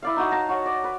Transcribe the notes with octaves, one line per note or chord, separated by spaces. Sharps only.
E4 D5 F5
D#4 F#4 D#6
F5 A5 A#5
F#4 C#5
D5
B4